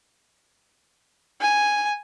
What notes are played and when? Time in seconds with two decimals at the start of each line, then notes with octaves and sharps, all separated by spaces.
1.41 G#5